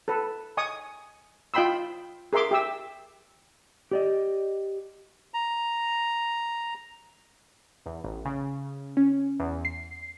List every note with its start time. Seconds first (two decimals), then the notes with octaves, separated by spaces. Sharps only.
0.08 A4 B4
0.57 D#5 G#5 C#6 D#6
1.54 F4 D#5 G5 B5 C6 E6
2.33 G#4 A#4 E5 C6 D6
2.51 G4 E5 E6
3.91 G4 D5 D#5
5.34 A#5
7.86 E2
8.04 A1
8.25 C#3
8.97 C#4
9.40 E2
9.65 C7